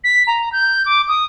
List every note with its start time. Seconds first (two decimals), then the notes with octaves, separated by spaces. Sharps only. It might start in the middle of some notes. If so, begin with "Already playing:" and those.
0.04 B6
0.27 A#5
0.52 G6
0.86 D6
1.08 D#6